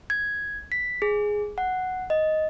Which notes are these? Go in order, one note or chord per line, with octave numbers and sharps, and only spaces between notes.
G#6
B6
G#4
F#5
D#5